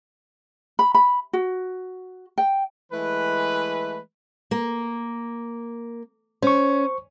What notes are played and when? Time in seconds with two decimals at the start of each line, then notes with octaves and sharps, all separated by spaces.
0.79 B5
0.94 B5
1.33 F#4
2.38 G5
2.92 E3 G#3 A3 B4
4.51 A#3
6.43 C#4 C5 C#6